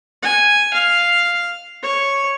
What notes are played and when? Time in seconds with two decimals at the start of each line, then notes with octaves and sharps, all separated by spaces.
0.22 G#5
0.74 F5
1.83 C#5